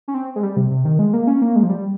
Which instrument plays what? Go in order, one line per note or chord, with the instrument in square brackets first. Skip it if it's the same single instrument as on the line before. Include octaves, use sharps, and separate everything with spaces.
[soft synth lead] C#4
C4
G#3
G3
C3
C3
D#3
G#3
A#3
C#4
A#3
G#3
F3
G3